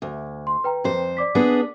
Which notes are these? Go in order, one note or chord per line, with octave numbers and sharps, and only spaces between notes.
D2
C6
B4 G5 A#5
F2 C5
D5 D6 B6
B3 D4 G#4